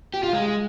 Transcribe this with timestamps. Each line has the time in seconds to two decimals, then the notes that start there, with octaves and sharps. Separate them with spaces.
0.14 G4
0.23 F4
0.33 G#3